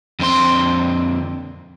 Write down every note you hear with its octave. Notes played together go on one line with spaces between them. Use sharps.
F2 D3 C4 C6